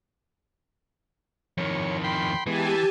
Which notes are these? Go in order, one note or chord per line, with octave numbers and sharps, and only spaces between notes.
F2 D#3 C#5
G5 B5 C6
E3 G#3 B3 G4 G#5 A5